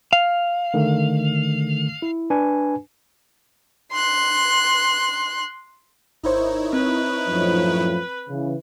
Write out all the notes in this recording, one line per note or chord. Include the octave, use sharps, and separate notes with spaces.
F5
D3 D#3 A3
E4
D4 B4 G#5
C6 F#6
G#1 D#4 E4 A#4 C5 C#5
C4 B4
F#2 A2 F3
C#3 E3